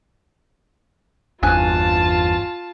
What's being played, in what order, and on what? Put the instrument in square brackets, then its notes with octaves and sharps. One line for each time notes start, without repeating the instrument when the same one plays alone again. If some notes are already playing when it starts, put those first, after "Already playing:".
[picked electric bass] G1 E2 D4 [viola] F4 A5 [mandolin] G#5 F#6